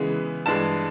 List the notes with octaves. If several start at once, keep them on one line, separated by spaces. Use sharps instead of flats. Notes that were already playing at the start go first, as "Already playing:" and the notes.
Already playing: C#3 E3 G#3 B3
G2 E3 G#3 A5